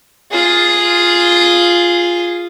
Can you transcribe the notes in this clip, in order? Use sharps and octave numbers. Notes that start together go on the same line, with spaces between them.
F4 G#4